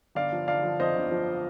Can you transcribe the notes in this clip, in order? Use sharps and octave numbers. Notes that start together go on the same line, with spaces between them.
G1 D5 F5
F3
D3 D5 F5
F3
F2 C5 D#5
G1
F3